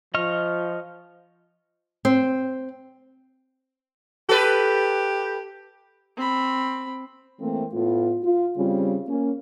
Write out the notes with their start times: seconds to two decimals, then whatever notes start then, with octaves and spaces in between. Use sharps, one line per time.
0.14 F3 D#5 C#6 F6
2.05 C4
4.29 G4 A4 B4
6.17 C4 B5
7.40 E3 A3 A#3 C4
7.74 A2 A3 B3 F4
8.24 F4
8.57 C#3 G3 C4 C#4 F4
9.07 A#3 C#4